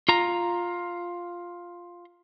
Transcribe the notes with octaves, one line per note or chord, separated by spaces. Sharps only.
F4 A#5